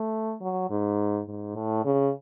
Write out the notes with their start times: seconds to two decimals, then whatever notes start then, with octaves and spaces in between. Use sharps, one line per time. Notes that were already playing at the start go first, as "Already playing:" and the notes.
Already playing: A3
0.41 F#3
0.70 G#2
1.27 G#2
1.55 A2
1.85 C#3